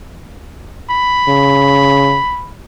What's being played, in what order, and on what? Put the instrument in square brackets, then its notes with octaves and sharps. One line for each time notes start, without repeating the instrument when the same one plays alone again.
[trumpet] B5
[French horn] C#3